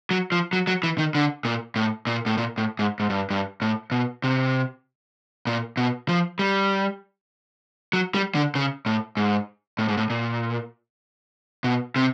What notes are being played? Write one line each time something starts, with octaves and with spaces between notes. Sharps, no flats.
F#3
F3
F#3
F#3
E3
D#3
D3
A#2
A2
A#2
A2
A#2
A2
G#2
G#2
G2
G2
A2
B2
C3
A#2
B2
F3
G3
F#3
G3
D3
C#3
A2
G#2
A2
G#2
A2
A#2
B2
C3